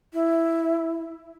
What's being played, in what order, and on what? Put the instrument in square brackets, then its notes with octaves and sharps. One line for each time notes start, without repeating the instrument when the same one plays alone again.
[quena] E4